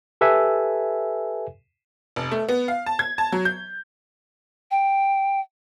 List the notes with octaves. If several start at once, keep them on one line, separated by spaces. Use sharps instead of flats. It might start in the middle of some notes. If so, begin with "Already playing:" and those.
G4 A4 B4 E5 G#5
F1
A3
B3
F5
A5
G#6
A5
F#3
G6
G5